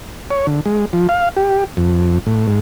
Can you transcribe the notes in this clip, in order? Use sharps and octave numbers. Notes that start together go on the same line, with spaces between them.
C#5
D3
G#3
F3
F5
G4
F2
A2
G#2